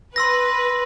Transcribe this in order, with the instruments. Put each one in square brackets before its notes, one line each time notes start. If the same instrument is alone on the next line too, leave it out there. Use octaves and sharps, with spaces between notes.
[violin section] B4 [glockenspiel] C6 E6 A#6